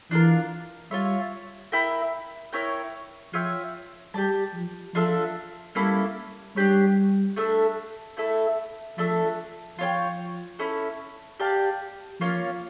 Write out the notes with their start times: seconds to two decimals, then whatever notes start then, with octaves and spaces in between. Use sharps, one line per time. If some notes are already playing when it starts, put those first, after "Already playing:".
0.11 E3 D4 F4 A#4
0.91 G3 F4 C#5 E5
1.72 E4 A#4 E5 G5
2.53 E4 A#4 C#5 G5
3.34 F3 F4 C#5 E5 G5
4.14 G3 G4 D5 A5
4.54 F3
4.94 F3 D4 F4 A4 E5
5.75 G3 A#3 C#4 E4 A4
6.56 G3 D4 G4 C#5
7.36 A3 D4 A4 E5
8.17 A3 E4 A4 E5
8.98 F3 A3 D4 A4 E5
9.78 F3 F4 C#5 G5
10.59 C#4 E4 A4
11.40 G4 D5 F5 A5
12.20 F3 A#3 C#4 F4 C#5